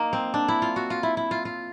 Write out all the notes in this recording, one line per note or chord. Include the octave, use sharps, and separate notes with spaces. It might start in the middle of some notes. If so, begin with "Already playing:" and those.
Already playing: A#3 D#4
C4
D4
E4
F4
F#4
F4
E4
E4
F4
F4